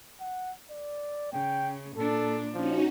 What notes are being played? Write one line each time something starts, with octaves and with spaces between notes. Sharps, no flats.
F#5
D5
C#3 G5
A#2 D4 A4
F3 C#4 D#4 F#4